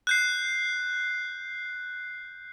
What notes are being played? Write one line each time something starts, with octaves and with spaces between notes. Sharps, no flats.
F#6 G6 C7